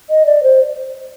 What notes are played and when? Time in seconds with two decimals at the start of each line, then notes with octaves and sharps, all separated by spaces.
0.10 D#5
0.26 D5
0.43 C5